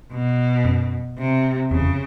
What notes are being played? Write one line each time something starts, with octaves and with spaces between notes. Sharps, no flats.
B2
F#2
C3
E2 C#3
F2